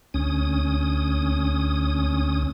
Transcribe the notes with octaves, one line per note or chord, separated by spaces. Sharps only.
D2 C#4 D#6